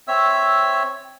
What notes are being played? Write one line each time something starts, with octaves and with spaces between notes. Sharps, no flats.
C4 C#5 E5 E6